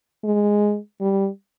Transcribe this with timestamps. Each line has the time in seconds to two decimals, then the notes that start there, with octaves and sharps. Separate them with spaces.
0.24 G#3
1.01 G3